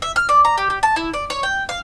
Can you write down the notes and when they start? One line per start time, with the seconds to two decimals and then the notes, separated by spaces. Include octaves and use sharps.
0.02 E5
0.16 F6
0.29 D5
0.45 A#5
0.57 G4
0.70 G4
0.83 A5
0.96 E4
1.14 D5
1.30 C#5
1.43 G5
1.69 F5